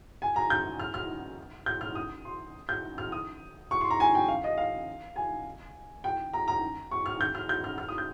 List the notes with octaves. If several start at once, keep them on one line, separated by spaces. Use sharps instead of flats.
G#5
A#5
G6
F6
F6
G6
F6
D#6
C6
G6
F6
D#6
C#6
C6
A#5
G#5
G5
F5
D#5
F5
G#5
G5
A#5
A#5
C#6
F6
G6
F6
G6
F6
F6
D#6
G6